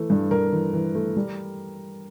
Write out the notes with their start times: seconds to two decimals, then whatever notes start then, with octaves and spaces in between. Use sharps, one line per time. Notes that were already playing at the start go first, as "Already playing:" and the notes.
Already playing: E3 A3
0.10 G2
0.31 G2 A#4
0.52 E3
0.73 E3
0.95 A3
1.16 G3